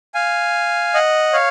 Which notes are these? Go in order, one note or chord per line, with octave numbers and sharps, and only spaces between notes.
F5 G#5
D#5 F#5
C#5 F5